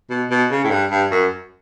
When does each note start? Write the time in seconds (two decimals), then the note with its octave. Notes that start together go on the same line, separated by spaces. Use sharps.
0.10 B2
0.30 B2
0.51 C#3
0.64 A2
0.71 G2
0.91 G2
1.11 F#2